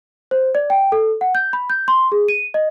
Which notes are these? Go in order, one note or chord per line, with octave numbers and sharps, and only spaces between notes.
C5
D5
G5
A4
F#5
G6
B5
G6
C6
G#4
D#7
D#5